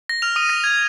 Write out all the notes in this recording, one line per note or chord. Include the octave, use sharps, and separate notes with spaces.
A#6
F6 F7
D#6 D#7
A#6
G#6